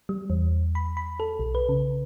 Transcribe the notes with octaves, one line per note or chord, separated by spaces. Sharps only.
G3
E2
B5
B5
A4
B1
B4
C#3